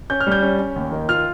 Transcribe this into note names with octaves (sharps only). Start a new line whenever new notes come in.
C#4 G6
F6
G3 G6
C#4
C#4
D#2
D#3
F4 F6